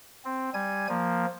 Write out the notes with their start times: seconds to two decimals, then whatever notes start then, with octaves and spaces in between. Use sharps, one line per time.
0.25 C4
0.54 G3 G#5 G#6
0.89 F3 A#3